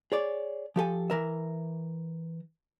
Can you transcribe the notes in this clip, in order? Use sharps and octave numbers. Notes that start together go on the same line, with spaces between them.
G#4 C#5 D5
F3 G4 A4 G#5
E3 A#4 E5